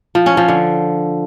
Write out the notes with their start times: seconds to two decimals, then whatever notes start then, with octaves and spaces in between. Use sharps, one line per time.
0.15 F3
0.26 C#4
0.37 F3
0.48 D3